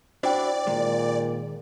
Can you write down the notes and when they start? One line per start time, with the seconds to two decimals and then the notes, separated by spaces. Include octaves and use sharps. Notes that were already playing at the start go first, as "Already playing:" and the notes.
0.23 D4 E4 F#4 C5 D5 G5
0.67 A#2 D#3 G#3